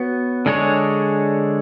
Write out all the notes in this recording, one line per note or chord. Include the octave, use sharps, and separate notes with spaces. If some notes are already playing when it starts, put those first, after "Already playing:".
Already playing: B3 F#4 C#5
D3 G#3 D4 G#4 C#5